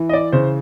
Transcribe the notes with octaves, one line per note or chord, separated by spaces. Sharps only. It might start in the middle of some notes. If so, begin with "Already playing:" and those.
Already playing: E3
D#5
D5
C#3 C5